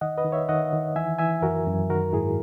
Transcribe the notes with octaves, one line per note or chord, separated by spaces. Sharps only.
D#3 D#5 F#5
B4 D#5
D#3
C#5 E5
D#3 D#5 F#5
D#3
E3 E5 G#5
E3 E5 G#5
F#2 F#4 A#4
F#2
D#3 F#4 A#4
G#2 E4 G#4